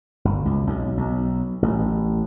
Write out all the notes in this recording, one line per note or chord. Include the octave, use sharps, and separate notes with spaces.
G1
C#2
B1
B1
A1